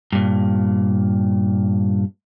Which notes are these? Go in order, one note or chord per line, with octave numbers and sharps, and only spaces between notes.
G2 A#2